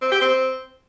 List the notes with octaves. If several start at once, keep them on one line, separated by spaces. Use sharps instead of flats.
C4
G4
C4